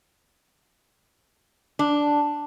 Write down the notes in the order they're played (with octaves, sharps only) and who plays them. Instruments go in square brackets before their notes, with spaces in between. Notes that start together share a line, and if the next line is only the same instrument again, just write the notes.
[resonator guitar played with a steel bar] D4